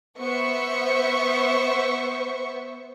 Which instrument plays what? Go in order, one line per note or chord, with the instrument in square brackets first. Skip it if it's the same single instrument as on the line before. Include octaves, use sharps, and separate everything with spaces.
[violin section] B3 C5 E5 C#6